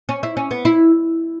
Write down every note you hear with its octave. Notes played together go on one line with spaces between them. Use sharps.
C#4
E4
C#4
B3
E4